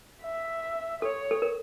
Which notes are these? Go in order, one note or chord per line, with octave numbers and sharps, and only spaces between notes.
E5
A4 C#5
A4
A#4